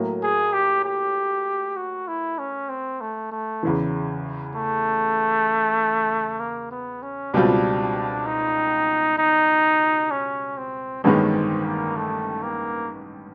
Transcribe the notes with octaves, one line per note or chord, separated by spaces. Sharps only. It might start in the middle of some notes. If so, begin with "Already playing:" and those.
Already playing: A2 F#3 A#3
G#4
G4
G4
F#4
E4
C#4
C4
A3
A3
E2 C#3 E3
A3
A#3
B3
C#4
C#2 B2 G3 C4 D4 F4
D#4
D#4
C#4
C4
A1 G2 D#3 G#3 B3 C#4
C4
A#3
A3
A#3